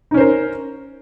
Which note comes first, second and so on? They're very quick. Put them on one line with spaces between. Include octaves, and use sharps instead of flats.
D#4 C#4 C5 A#4